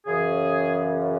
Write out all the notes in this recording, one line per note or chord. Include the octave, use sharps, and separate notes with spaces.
F#2 C#3 E3 G#4